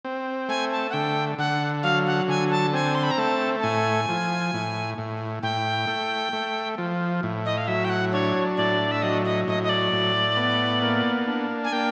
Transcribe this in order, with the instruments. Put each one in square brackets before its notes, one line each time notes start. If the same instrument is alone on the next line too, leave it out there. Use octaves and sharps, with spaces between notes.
[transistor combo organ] C4
[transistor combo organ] A3 [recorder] G#5
[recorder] A5
F#5
[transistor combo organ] D3 [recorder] G5
[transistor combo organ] D3 [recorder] F#5
[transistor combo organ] F#3 [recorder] F5
[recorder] F#5
[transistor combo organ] D3 [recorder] G#5
[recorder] A5
[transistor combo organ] C4 [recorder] G#5
[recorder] C6
B5
A#5
[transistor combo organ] A3 [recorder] A5
[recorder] A5
[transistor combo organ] A2 [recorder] G#5
[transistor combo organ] F3
A2
A2
[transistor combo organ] A2 [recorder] G5
[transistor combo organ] A3
A3
F3
A2
[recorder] D#5
F5
[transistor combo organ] F#3 [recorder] E5
[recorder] G5
F#5
[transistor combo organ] D4 [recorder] C#5
[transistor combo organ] A2 [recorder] D5
[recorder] E5
[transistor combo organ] F#3 [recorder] D#5
[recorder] D#5
[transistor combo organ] A2 [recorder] D#5
[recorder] D#5
D5
[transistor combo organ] A2
B3
A#3
D4
[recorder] G#5
[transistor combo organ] A#3 [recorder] G5